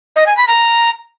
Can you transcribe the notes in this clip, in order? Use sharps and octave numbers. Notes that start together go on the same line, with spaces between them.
D#5
G#5
B5
A#5